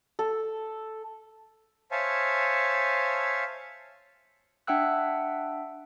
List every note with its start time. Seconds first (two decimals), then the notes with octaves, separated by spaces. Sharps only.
0.19 A4
1.91 C5 C#5 E5 F5 G#5 A5
4.67 D4 E5 F#5 G5 E6 F#6